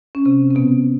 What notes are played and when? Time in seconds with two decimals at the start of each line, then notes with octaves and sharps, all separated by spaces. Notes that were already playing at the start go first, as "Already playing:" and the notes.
0.15 C#4
0.25 C3 C4
0.51 C4
0.55 B2 B3